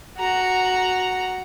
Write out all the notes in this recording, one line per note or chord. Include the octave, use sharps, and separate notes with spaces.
F#4 A#5